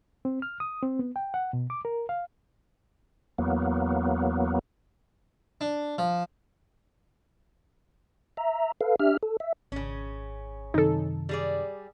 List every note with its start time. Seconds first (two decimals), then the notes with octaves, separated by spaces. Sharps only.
0.25 C4
0.42 F6
0.60 D#6
0.83 C4
0.99 B3
1.16 G5
1.34 F#5
1.53 B2
1.70 D6
1.85 A#4
2.09 F5
3.38 E2 F#3 A#3 B3
5.61 D4
5.98 F3
8.37 E5 A#5
8.81 A4 B4 F5
9.00 D4 G4 E5 F6
9.23 A4
9.40 E5
9.72 G#1 C#3 C#4
10.74 F#2 C3 D#3 D#4 A4
11.29 G3 G#4 D5